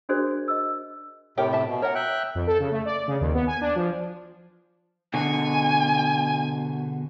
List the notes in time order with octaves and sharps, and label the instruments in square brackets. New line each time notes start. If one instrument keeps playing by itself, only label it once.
[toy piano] D4 F#4 G#4 A#4 C5 D5
D#5 E6
[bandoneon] A2 C3 [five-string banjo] G4 A#4 C#5
[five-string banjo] E5 A5
[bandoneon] B2
[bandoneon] A#4 [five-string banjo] C#5 F#5
[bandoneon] E5 G5 F#6
[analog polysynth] F2
A4
C#3
A3
D5
C#3
D#2
B3
G#5
D4
F3
[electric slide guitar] B2 D3 [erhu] G#5